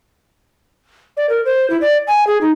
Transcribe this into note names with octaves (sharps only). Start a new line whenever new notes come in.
D5
A#4
C5
E4
D5
G#5
G#4
D#4